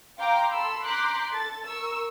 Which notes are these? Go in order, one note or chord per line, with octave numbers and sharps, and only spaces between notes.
F5 G5 A#5 C6 D6
A4 B5 C6 E6
A#5 C6 D6 F#6 G6 B6
A4 A6
A#4 C#6 E6